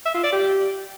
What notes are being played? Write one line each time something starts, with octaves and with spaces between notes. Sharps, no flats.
E5
F4
D5
G4